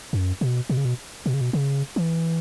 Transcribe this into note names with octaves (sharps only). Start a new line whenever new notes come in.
F#2
B2
B2
C#3
B2
B2
C#3
B2
C#3
E3